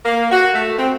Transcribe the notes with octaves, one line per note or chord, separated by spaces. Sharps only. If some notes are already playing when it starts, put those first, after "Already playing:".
A#3
F#4
A3
C4